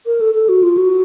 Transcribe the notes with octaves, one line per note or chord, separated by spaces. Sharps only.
A#4
A4
A4
F#4
F4
F#4